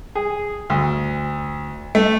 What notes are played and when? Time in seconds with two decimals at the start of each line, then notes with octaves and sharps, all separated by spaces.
0.15 G#4
0.70 D2
1.95 A3